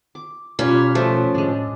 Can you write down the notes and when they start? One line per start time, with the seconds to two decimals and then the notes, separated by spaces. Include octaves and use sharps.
0.15 D6
0.59 B2 G3 A#3 C#4 F4
0.95 F3 A3 C#4 E5
1.35 A2 G#3 D4